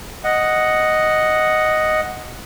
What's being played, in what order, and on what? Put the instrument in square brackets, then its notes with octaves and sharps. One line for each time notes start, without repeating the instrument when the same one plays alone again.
[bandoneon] D#5 F#5